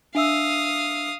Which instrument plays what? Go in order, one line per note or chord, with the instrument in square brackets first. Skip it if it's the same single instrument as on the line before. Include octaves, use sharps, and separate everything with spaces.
[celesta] D4 E5 E6 [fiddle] F5 D#6